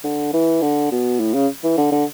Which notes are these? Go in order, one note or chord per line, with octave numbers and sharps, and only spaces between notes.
D3
E3
D3
B2
A2
C#3
E3
D3
D3